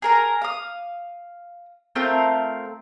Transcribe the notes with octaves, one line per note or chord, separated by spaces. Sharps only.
G#4 A#4 A#5
F5 D#6
A3 C4 F4 A#4